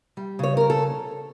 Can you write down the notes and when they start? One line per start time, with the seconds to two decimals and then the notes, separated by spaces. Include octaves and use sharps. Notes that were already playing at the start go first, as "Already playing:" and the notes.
0.17 G3
0.39 C#3 C#5
0.57 C#4 A#4
0.70 A4